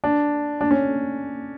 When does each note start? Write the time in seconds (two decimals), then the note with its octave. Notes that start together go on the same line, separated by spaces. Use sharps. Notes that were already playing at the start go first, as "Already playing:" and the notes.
0.04 D4
0.61 D4
0.71 C#4